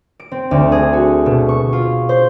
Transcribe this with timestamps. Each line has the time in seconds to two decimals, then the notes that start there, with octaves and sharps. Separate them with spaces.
0.20 D7
0.32 C4
0.51 D2
0.72 G#4
0.93 F#4
1.26 B2
1.49 C#6
1.73 F4
2.09 C5